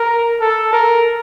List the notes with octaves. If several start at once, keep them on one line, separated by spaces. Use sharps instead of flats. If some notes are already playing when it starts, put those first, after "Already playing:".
Already playing: A#4
A4
A#4